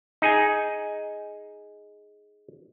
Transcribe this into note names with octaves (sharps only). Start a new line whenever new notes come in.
D#4 G#4 G#5